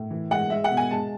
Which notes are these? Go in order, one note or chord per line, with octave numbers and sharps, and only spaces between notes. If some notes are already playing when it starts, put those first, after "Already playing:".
Already playing: A2
E3
G#3 F#5
G#3 E5
F#5
B2
G#5
G#3 A5